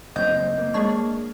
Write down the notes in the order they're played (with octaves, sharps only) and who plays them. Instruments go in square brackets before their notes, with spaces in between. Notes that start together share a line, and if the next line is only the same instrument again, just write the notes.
[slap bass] F#1 C4 [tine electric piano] D#5 [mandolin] G6
[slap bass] A#3
[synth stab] G#3 D4 C#5